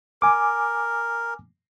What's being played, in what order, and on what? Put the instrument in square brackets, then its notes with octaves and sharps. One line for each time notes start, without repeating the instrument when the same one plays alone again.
[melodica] A#4 [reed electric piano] G#5 D6